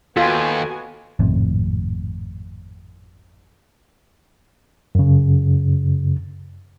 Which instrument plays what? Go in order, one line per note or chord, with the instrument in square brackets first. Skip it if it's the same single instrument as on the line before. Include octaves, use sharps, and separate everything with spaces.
[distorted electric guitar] D#2 [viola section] B3 F#4 G#5 [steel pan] F4 [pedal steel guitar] A4 B4 G5
[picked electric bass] G#1 F2 A2 C3
[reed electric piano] F#2 C#3